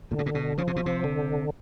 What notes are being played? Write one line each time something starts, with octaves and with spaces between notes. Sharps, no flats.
A#2 D3
A2
A#2
B2
C#3 F3
C3
B2
C3
D3